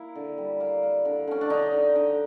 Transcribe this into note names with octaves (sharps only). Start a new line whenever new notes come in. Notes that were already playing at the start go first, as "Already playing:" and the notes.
Already playing: A#3 E4
D3
G3
A#3
A#3
D3
D3 C#4
D4
D3 D#4
D3
D3